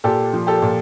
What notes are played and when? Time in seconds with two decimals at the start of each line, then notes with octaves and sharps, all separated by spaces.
0.04 A#2 G4 A4
0.33 F3
0.47 G4 A4
0.62 A#2